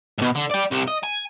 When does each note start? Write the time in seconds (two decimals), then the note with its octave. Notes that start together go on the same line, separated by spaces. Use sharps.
0.18 G#2 B2
0.36 D3
0.51 D5 G5
0.71 C2 C3
0.88 D#5
1.03 G#5